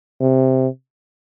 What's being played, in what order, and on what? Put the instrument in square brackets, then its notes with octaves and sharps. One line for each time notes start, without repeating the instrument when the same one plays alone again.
[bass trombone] C3